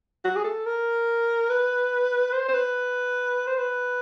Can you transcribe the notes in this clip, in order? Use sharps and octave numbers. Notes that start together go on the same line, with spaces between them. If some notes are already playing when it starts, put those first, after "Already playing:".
F#4
G#4
A4
A#4
B4
C5
C5
B4
C5
B4